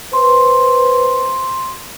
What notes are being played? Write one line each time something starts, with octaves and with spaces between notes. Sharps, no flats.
B4 C5 C6